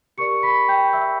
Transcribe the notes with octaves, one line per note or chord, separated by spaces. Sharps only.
G4 A#4 D5 C#6 C#7
B5 B6
G5 G6
E5 E6